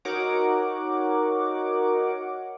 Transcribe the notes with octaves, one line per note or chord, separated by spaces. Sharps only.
D#4 F#4 A#4 C#5 F#5 D6